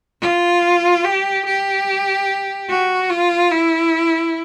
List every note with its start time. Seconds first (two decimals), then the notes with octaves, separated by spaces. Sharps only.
0.22 F4
1.05 G4
1.46 G4
2.70 F#4
3.10 F4
3.51 E4